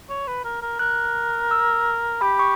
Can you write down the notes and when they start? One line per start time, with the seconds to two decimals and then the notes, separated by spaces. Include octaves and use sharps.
0.09 C#5
0.27 B4
0.44 A#4
0.62 A#4
0.79 A#4 F#6
1.51 E6
2.21 G4 B5
2.39 C#6